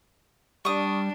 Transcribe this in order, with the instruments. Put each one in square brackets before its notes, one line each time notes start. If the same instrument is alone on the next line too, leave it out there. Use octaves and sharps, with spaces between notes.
[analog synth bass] G3 [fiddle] D4 [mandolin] C#6 D#6